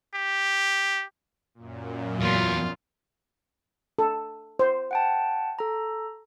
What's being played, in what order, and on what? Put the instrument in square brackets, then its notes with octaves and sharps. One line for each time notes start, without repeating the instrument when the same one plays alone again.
[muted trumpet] G4
[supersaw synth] F#2 A#2
[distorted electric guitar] E2 E3 [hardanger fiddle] F4
[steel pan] A4
C5
[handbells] F#5 G5 A5
A4 A#5